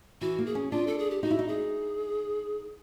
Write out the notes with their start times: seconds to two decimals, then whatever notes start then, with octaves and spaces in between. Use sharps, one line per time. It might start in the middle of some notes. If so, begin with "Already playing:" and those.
0.21 E3 F#4
0.39 A#3
0.46 G#4
0.55 C#4
0.71 D4 F4
0.87 A4
0.98 G#4
1.10 G4
1.23 D#4 F#4
1.31 E4
1.39 D#4
1.48 G#4